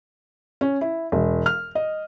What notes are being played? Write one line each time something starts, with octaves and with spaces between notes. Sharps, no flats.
C#4
E4
E1
F6
D#5